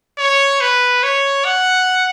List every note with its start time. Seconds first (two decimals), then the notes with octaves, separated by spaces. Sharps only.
0.18 C#5
0.61 B4
1.03 C#5
1.45 F#5